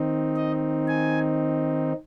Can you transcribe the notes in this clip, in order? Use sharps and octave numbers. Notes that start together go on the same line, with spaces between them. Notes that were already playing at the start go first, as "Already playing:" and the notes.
Already playing: D#3 C4 D#4
D#5
G#5